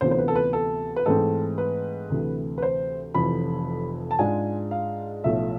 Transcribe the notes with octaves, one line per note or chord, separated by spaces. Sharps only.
D2 C3 E3 B3 F4 C5
C5
B4
A4
B4
A4
B4
G#2 E3 A3 C4 A4
B4
D2 C3 E3
B4
C5
F1 F2 E3 B5
A5
G#2 G#3 D4 F4 G#5
F5
B1 A2 F3 A3 E5